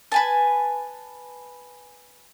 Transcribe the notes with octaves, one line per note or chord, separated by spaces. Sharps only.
B4 G#5 A5